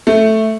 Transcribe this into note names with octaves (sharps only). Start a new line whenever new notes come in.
A3